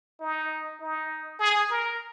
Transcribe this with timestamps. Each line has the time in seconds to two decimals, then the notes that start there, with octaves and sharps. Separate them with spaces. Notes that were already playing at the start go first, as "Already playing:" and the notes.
0.21 D#4
0.81 D#4
1.40 G#4
1.70 A#4